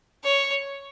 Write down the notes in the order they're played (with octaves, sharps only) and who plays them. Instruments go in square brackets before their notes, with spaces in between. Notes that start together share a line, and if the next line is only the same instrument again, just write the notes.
[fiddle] C#5